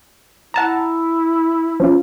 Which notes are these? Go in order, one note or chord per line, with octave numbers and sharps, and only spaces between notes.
E4 F#5 A5 A#5
F3 C#4 F4